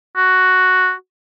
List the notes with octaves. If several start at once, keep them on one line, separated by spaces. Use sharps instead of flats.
F#4